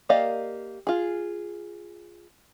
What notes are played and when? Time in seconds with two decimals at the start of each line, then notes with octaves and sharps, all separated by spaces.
0.09 A#3 G4 D5 D#5 F5
0.87 F4 G#4